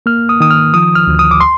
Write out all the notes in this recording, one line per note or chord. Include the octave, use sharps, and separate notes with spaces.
A#3 F6
D#6
D#3 D#6
F6
F3 D#6
F6
D2
D#6
D6
C6